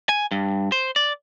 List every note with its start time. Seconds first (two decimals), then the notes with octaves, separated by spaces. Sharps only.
0.09 G#5
0.31 G2
0.72 C5
0.96 D5